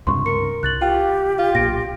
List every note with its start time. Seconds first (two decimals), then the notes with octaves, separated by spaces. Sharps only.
0.07 C#2 G2 C3 C6 C#6
0.26 A#4 C#6 C#7
0.63 C2 F#6 A6 F#7
0.82 F4 G4 G5
1.39 F4
1.55 B1 A#2 A#6 D7